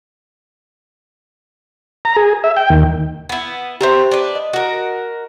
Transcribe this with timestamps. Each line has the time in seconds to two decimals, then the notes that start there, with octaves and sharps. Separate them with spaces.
2.05 A#5
2.16 G#4
2.44 E5
2.57 G5
2.70 D#2
3.29 B3 E4
3.81 C4 G4 C5 E5 A#5
4.11 D4 B4
4.35 D#5
4.53 F#4 A#4